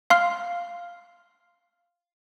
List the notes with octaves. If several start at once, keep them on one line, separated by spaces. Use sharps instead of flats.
F5 C6 F6